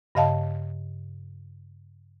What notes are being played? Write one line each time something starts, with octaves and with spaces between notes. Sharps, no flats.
G2 C#3 D#5 F5 A5